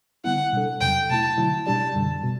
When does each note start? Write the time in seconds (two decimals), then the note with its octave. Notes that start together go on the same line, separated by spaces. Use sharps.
0.24 D3 G3 B3 E4 F#5
0.53 B2 G3 D4 A4
0.81 E2 C3 F#3 G5
1.10 B2 A3 E4 A5
1.38 D3 F#3 A3 E4
1.66 B2 G3 D4 G4 D5 A5
1.95 F#2 D3 G3
2.24 B2